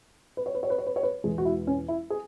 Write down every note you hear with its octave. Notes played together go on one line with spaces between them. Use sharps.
B4
C#5
B4
C#5
B4
C#5
B4
C#5
B4
E1 E2 E3 G#3 G#4
F#4
E4
C#4
E4
G#4